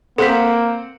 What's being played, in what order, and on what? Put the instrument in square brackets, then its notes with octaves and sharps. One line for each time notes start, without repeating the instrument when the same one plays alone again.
[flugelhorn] A#3 [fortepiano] C4 C5 F#5 [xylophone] A4 B6